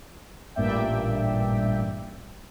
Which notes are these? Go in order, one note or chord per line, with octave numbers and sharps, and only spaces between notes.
A1 G2 A#2 D5 E5 G5